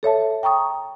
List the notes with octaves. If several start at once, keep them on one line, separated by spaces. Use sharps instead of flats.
A4 C#5 E5 A5
G5 A#5 C#6 D#6